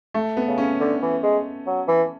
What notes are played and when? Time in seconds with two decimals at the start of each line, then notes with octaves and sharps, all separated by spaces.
0.14 A3
0.37 B3
0.48 C#3
0.58 C#4
0.80 D3
1.02 E3
1.23 G#3
1.67 F#3
1.88 E3